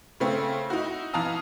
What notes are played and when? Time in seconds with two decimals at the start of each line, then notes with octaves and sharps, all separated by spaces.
0.20 C#3 A3 C4
0.70 D#4 E4 F#4
1.13 E3 F5 A5 A#5 D#6